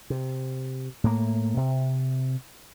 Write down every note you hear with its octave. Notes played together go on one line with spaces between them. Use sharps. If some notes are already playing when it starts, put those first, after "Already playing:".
C3
A2 A#3
C3